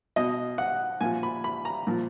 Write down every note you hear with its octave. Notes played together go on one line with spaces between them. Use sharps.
B2 D#5
F#5
A#2 F3 G#5
B5
B5
A#5
A#2 F3